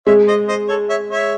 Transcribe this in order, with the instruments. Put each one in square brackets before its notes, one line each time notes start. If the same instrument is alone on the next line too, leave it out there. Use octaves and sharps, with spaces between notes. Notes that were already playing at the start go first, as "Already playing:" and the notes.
[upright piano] G#3 [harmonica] C#5 E5
[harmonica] C5 D#5
C5 D#5
A4 C#5
C#5 E5
C#5 E5